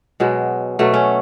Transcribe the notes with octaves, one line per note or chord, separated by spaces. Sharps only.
B2 F#3 G#3
B2 F#3 A3
C#4